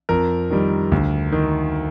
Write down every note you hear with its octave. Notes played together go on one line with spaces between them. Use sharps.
F2 A#4
D#3 G3
D2
D#3